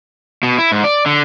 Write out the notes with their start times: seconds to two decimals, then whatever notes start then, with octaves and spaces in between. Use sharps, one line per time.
0.43 B2
0.58 E4
0.72 G#2
0.84 D5
1.06 D3